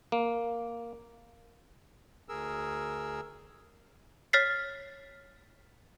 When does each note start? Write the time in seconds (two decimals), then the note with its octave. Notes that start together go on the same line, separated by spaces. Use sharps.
0.12 A#3
2.29 D2 G#4 A#4 E6
4.33 C#5 F6 A6 B6 C7